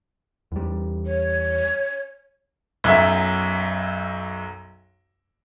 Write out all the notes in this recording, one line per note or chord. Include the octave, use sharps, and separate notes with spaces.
E2 G3
C#5
B1 F#2 E5